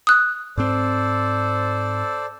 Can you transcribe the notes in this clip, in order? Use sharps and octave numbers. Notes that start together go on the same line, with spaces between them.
D#6 F#6
G#2 C4 A4 C5 D5